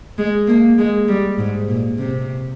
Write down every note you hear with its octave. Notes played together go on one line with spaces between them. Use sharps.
G#3
A#3
G#3
G3
G#2
A#2
C3